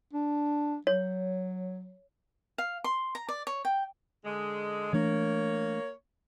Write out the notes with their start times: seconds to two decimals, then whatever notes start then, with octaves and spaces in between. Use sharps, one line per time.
0.13 D4
0.87 F#3 C#5
2.58 F5
2.84 C6
3.15 A#5
3.29 D5
3.47 C#5
3.65 G5
4.25 D3 G#3
4.93 E3 A3 A#3 D4 C#5